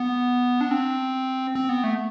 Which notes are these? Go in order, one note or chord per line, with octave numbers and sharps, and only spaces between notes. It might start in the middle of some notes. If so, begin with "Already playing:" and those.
Already playing: B3
D4
C4
C4
B3
A3